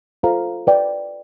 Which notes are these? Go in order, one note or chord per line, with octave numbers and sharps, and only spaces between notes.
F4 A4 C5 F5 A#5
B4 D5 G5